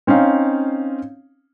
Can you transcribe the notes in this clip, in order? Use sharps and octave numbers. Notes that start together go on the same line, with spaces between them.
C4 C#4 D#4 F5